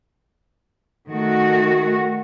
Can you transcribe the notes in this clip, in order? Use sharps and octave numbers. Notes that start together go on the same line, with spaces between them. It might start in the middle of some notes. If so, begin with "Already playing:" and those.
D#3 A3 F#4